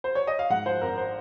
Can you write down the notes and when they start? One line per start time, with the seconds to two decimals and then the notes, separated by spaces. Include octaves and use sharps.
0.04 C5
0.15 C#5
0.27 D#5
0.39 F5
0.50 G#2 F#5
0.66 F3 C5
0.82 G#1 A#4
0.98 C5